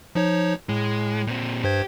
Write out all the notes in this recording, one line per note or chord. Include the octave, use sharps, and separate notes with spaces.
F3 D#4 C#5
A2 G#3
A#2 C4
G2 G4 C5 G#6